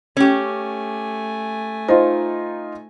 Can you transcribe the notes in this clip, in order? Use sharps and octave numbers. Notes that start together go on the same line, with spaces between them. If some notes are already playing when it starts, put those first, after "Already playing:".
A3 C#4 G4 G#5
D#4 F4 C5